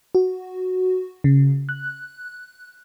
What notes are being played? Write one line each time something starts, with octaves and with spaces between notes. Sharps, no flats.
F#4
C#3
F#6